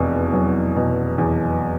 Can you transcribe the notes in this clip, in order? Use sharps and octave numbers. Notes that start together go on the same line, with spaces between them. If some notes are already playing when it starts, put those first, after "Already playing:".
Already playing: F1 E2 B2
F#3
B2
E2